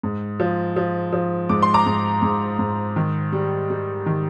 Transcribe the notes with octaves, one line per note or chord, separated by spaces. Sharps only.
G#2
F3
F3
F3
G#2 D6
C6
A#5 D6
G#2
G#2
G#2
D#3
G3
G3
D#3